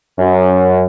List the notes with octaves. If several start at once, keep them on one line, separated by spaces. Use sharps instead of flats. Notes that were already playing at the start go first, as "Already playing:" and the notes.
F#2